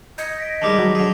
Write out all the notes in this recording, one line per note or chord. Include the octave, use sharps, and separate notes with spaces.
D#5 G6 G#6 C#7
A#6 B6 D7
D#3 G3 G#3 A5 D6 A#6
F#3
D3 G#4